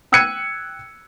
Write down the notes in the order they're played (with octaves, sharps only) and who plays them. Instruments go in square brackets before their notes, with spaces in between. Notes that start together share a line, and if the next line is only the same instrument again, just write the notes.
[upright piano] G5 E6 F#6 G#6 C#7 D#7